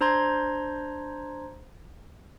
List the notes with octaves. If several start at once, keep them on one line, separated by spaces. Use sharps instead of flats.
D4 C5 A#5 C6 G#6